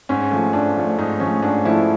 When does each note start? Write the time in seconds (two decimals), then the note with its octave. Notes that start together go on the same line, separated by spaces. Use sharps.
0.09 G#2 C#4
0.31 F3 A3
0.53 G#2 D4
0.77 F3 A3
0.98 G#2 D#4
1.20 F3 A3 C#4
1.43 G#2 D4
1.65 F3 A3 E4